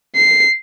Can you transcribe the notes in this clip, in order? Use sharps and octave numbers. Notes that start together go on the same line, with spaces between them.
C7